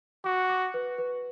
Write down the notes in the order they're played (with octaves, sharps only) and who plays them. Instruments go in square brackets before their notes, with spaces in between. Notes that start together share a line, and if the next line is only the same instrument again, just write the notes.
[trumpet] F#4 [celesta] D6
[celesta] D6
B4
B4